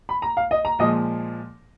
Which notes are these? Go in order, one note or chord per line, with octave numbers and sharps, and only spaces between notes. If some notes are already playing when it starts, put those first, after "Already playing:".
B5
A#5
F5
D#5
A#5
A#2 F3 G#3 D#5